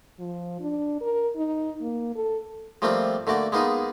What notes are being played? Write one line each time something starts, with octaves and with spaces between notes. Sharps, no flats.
F3
D4
A#4
D#4
A#3
A4
F3 G3 A3 A#3 C4 F4
D3 A3 A#3 F#4 D5
G#3 A#3 B3 D#4 F4 G#4